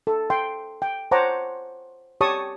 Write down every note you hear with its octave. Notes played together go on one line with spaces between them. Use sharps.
A4
G5 C6
G5
C5 C#5 F#5 A5 A#5 D6
G4 C#5 A5 C#6 D#6